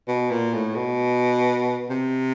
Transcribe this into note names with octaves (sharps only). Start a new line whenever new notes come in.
B2
A#2
A2
B2
C3